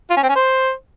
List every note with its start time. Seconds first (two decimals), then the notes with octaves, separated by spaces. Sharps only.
0.11 F4
0.17 C#4
0.23 C4
0.29 C#4
0.35 C5